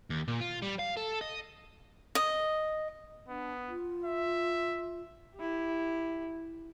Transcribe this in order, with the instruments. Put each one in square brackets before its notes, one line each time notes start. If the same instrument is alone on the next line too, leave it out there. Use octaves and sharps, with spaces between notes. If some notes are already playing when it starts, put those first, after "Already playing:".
[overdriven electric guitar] D#2
A#2
F4
G3
F5
A4
D#5
[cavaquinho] D#5
[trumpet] B3 [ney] D4
[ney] F4
[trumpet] E5
[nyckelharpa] E4 G4